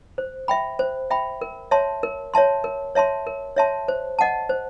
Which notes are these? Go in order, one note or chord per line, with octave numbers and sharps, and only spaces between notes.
C5
E5 G5 B5
C5
E5 G5 B5
A#4
C#5 E5 A5 C6
A#4
C#5 E5 A5 C6
A#4
C#5 E5 A5 C6
A#4
C#5 E5 A5 C6
C5
D#5 F#5 A5
C5